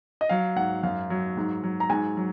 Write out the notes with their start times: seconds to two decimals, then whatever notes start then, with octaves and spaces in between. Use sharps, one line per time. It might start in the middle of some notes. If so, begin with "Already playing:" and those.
0.21 D#5
0.29 F#3 F5
0.56 G#2 F#5
0.83 F#2 F5
1.10 F#3
1.37 G#2
1.64 F#3
1.80 A#5
1.90 G#2 G#5
2.17 F#3